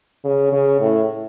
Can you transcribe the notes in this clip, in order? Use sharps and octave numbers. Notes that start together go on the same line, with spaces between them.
C#3
C#3
A2